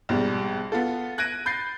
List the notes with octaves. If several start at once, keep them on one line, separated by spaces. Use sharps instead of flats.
A#1 G#2 B2 G3
B3 F4 A4
F#6 G#6 A#6 D7 D#7
B5 G6 A6 C7